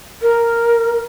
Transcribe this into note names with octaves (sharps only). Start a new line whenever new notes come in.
A#4